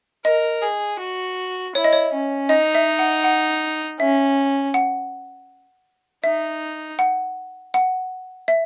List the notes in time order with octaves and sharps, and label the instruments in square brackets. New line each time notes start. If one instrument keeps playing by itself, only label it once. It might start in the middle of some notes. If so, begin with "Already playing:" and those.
[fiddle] A#4 [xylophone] D#5
[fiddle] G#4
F#4
[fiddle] E4 [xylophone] C#5
[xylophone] D#5
C#5
[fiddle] C#4
[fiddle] D#4 [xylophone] D#5
[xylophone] E5
F#5
F#5
[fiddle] C#4 [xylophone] E5
[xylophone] F#5
[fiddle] D#4 [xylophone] E5
[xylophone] F#5
F#5
E5